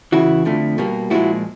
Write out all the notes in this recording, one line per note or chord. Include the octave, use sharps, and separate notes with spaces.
E2 C#3 E3 E4 F#4
F2 D3 F3 A3
B2 G3 A#3
A#2 F3 G#3 E4 F#4